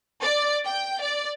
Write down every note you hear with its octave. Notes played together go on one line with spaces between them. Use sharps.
D5
G5
D5